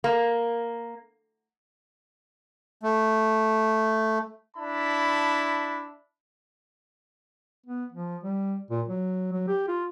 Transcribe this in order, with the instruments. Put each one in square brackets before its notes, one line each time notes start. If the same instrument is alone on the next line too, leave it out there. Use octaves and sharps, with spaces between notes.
[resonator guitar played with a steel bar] A#3
[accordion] A3
[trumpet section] D4 E4 A5 B5
[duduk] B3
F3
G3
A#2
F#3
F#3
G4
F4